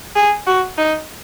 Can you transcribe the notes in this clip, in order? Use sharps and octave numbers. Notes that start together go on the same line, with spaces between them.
G#4
F#4
D#4